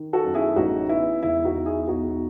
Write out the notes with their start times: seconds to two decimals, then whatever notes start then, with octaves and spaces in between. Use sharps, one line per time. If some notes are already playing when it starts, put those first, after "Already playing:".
Already playing: D#3
0.13 F#4 A4
0.24 F#2
0.34 E4 G#4
0.56 A1 D#4 F#4
0.89 B3 E4
1.23 E1 E4
1.44 D#4 F#4
1.56 E1
1.66 E4 G#4
1.88 B1 D#4 F#4